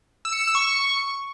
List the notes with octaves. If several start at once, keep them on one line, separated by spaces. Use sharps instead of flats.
E6
C#7
E7
E6
C#6